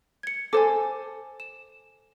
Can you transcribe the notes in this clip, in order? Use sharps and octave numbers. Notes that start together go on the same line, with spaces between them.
G#6 C#7
A4 C5 G#5 D6
E7